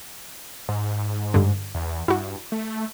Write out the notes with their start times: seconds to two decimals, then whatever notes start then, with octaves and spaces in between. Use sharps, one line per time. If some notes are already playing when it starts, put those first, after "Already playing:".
0.69 G#2
1.34 G2 D3
1.75 E2
2.08 G2 E4 F#4
2.52 A3